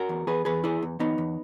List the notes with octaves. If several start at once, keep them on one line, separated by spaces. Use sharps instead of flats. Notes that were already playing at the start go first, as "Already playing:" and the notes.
Already playing: F#4 A#4
E2
E2 G#4 B4
E2 G#4 B4
E3 E4 G#4
E2
E2 B3 D#4
E2